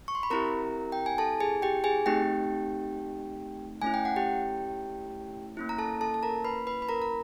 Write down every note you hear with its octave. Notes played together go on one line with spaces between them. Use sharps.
C#6
C6
B5
C4 E4 G4 A#4 A#5
G5
G#5
A4 A5
G#4 G#5
G4 G5
G#4 G#5
A3 C4 D#4 G4 G5
A3 C#4 E4 G#5
G5
F#5
G4 G5
A#3 C#4 E4
A#5
A4 A5
A4 A5
A5
A#4 A#5
B4 B5
B4 B5
B5
A#4 A#5
A#5